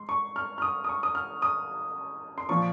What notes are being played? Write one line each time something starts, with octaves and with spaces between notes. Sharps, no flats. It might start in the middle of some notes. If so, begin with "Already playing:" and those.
Already playing: G#2 C6
C#6
F6
F6
D#6
D#6
C#6
D#6
F6
D#6
C6
A#2 F3 C#6